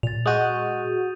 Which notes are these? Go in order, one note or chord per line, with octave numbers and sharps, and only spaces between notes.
A#2 A6 F7
G#3 F#4 D#6 G6 D#7